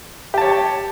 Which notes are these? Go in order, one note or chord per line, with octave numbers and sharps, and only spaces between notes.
G4 C#5 A5